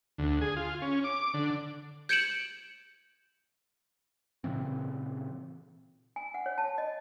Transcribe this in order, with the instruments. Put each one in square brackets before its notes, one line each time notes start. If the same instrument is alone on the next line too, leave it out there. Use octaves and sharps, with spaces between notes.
[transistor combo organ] D2
G#4
F4
C#4
D6
D3
[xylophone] G6 G#6 C#7 D7 E7 F#7
[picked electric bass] A#2 C#3 E3 C4
[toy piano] G#5
F#5
C#5
A5
D#5